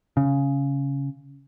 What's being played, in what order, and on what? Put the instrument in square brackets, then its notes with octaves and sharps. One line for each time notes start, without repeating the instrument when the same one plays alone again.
[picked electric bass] C#3